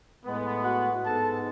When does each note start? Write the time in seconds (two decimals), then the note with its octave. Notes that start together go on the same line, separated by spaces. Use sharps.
0.25 A2 G#3 B3
0.65 F#4 F#5
1.05 G#2 G#3 B3 A4 A5